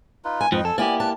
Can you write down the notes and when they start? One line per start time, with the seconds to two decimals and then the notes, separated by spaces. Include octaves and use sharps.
0.25 D#4 F4 B4
0.41 G#5
0.52 F2 G#2 F3 B4 D#5 G5
0.65 A4 G#5 E6
0.78 A#3 B3 E4 G4 D5 G#5
1.00 B4 D5 A5